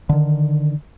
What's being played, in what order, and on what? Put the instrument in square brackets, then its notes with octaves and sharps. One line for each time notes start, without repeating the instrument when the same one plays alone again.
[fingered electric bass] D3 D#3